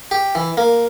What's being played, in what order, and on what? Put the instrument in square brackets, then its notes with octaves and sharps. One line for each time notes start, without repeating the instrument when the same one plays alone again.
[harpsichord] G4
E3
A#3